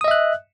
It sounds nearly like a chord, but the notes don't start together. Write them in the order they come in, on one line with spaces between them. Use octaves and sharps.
D#6 D#5 E5 F#6